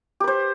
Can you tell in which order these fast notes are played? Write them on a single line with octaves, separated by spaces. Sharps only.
G4 B4 C5